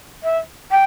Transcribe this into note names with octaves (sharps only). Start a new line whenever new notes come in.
E5
G5